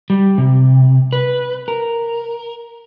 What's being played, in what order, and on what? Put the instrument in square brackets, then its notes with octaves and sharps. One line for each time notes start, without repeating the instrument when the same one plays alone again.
[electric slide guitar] G3
C3
B4
A#4